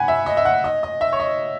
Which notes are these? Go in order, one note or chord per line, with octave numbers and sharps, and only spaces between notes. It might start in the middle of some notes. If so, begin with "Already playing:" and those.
Already playing: F#5 G#5 B5
E5
D#5
E5
F#5
D#5
D#5
E5
C#5
D#5